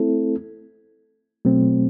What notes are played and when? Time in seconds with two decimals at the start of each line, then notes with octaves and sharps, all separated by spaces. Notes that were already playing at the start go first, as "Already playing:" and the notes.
Already playing: A3 C4 E4 A4
1.45 B2 F#3 A3 C4